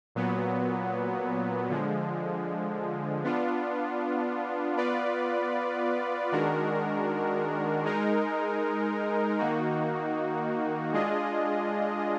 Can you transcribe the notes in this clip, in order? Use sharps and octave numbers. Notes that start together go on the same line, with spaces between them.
A#2 F#3 B3
D3 F3 G#3
B3 D4 F4
B3 F4 B4 D5
D#3 G#3 D4 F#4 A#4
G#3 D#4 A#4
D#3 A#3 D#4 F#4
G#3 D4 F4 G#4 D#5